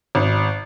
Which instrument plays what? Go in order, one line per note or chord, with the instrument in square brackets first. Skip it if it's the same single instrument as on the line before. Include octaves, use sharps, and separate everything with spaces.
[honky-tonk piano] G#1